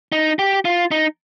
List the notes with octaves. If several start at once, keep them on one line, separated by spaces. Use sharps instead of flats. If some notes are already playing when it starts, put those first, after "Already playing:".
D#4
G4
F4
D#4